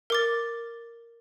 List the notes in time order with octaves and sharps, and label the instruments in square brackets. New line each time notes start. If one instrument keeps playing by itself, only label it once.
[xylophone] A#4 D6 A6